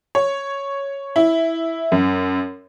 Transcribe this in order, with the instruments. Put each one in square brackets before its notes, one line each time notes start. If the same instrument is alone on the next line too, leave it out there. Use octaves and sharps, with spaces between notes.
[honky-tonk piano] C#5
E4
F#2